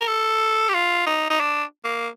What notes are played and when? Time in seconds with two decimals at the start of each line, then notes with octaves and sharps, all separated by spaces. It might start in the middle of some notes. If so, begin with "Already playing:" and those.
0.01 A#4
0.08 A4
0.69 G4
0.74 F4
1.07 D#4
1.30 D#4
1.40 D4
1.85 A#3